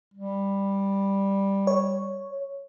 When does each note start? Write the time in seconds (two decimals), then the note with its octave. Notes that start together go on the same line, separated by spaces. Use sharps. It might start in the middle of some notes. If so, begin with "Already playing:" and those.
0.14 G3
1.67 C#5